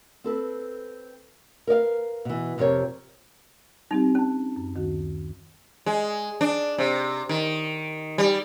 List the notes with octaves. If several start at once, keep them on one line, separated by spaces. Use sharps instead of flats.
C4 A4 B4
A#4 B4 D5 F5
B2 E3
F2 C3 F4 G4 A#4 C#5
G3 C4 D#4 G4
C#4 A5
F#2
D2 D#3 F#4
G#3
D4
C3
D#3
G3